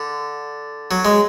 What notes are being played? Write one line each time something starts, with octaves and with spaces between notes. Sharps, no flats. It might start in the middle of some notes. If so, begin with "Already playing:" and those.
Already playing: D3
F#3
G#3